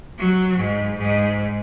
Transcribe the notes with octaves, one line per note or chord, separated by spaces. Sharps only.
F#3
G#2
G#2